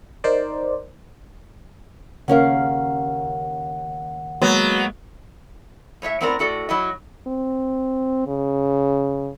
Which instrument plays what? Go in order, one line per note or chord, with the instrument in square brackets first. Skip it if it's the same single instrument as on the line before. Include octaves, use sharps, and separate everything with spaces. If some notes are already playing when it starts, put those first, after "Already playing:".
[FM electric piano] D#4 A#4 C5 D5
[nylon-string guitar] D#2 C#4 A#4 [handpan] C#3 F5 [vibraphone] F#5
[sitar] F#3 B3 [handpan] G#3 A#3
[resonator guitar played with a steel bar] A2 C#5 D5 E5
A2 B3 C4 A#4 D5 A#5
A2 F#4 A4 D5
F#3 E4 D#5
[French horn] C4
C#3